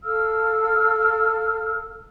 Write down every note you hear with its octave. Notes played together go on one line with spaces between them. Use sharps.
A4 F5 E6 F6